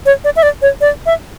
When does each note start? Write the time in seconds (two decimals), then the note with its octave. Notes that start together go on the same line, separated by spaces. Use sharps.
0.06 C#5
0.24 D5
0.36 E5
0.43 D5
0.62 C#5
0.81 D5
1.06 E5